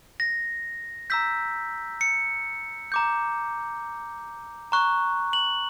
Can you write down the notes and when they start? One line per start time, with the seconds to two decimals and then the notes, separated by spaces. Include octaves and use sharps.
0.20 A#6
1.10 A#5 E6 G6 B6
2.01 C#7
2.92 A#5 D6 G6
4.72 A#5 C#6 F#6
5.33 F#7